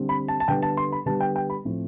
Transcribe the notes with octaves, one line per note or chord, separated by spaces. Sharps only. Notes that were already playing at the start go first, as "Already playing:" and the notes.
Already playing: D3 G3 C4
B5
A5
A5
D3 G3 B3 G5
A5
C6
B5
D3 G3 B3 A5
G5
G5
B5
A2 F3 A3 C4